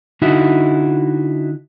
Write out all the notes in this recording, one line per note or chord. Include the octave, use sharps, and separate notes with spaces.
D3 D#4 E4 F#4